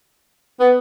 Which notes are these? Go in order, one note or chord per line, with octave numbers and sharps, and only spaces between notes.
B3